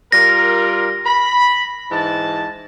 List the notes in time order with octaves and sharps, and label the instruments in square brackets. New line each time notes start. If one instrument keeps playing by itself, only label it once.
[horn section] G3 F4 A#4 [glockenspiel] A#6
[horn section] B5
G#2 E3 A5